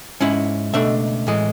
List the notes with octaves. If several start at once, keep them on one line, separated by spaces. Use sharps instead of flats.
G#2 G#3 C#4 E4
C#2 B2 A3 D4 E5
A2 E3 G#3